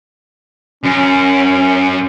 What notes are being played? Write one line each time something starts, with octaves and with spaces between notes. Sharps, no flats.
F#2 C#4